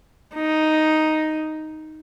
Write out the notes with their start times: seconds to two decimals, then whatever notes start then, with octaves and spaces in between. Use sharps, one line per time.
0.35 D#4